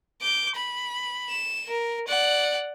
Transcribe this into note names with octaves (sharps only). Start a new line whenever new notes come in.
D6 G6
B5
E7
A#4
D5 F#5